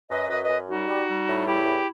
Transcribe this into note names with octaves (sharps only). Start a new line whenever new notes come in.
F#2 B4 D#5
F#2 B4 D#5
B4 D#5
F#2
G3 D#4 F#4
G3
G3
A2
E2 E4 G4
E2